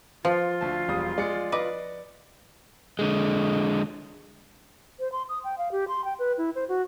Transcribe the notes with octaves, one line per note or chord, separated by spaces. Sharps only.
F3 F4
D2 A5
E1 G3 D#6
G#3 D5 C#7
B4 D#5 D6
D3 G#3
C5
C6
D#6
G5
F5
G4
C6
G5
B4
E4
C5
F#4